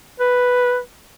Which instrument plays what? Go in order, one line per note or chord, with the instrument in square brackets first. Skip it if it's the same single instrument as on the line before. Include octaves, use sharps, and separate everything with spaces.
[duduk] B4